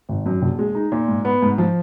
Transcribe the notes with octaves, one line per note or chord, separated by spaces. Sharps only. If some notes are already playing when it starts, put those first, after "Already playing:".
G#1
F#2
A#1
G#3
D#4
A#2
G#2
B3
G#2
F3